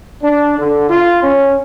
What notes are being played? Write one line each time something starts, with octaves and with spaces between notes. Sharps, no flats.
D4
D3
F4
C#4